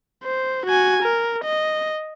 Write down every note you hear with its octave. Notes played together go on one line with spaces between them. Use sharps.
C5
F#4 G#5
A#4
D#5